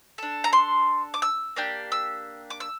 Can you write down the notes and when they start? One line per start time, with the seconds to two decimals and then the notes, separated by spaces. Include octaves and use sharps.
0.18 D4 A4
0.44 A#5
0.53 C6
1.14 D6
1.22 E6
1.56 A#3 D4 G4
1.92 E6
2.50 D6
2.60 E6